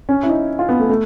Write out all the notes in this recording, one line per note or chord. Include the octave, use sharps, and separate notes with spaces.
C#4
E4
D#4
F4
B3
A3
A3